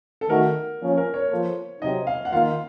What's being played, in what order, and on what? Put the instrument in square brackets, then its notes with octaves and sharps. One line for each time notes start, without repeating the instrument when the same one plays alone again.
[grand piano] A4
[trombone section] D#3 A3 D#4 F#4 [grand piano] A#4
[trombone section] F3 A#3 C#4 F4
[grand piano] A#4
C#5
[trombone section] F3 A#3 F4 A4 C5
[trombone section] C3 F#3 C4 D#4 [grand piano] D#5
[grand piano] F5
F#5
[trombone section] D#3 A#3 F4 [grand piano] F5